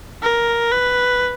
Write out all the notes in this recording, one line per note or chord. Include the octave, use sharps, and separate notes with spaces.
A#4
B4